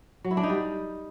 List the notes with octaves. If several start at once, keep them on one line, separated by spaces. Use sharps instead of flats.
F#3
E4
D4
D#4
G3